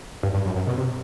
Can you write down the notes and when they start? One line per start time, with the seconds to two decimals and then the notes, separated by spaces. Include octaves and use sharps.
0.23 G2
0.34 G2
0.46 F#2
0.56 F#2
0.67 B2
0.78 C3